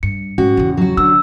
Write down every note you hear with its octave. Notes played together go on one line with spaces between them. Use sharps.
G2 C#7
G#2 C#4 F#4
E2 C#3
F#3 F#4
D3 E6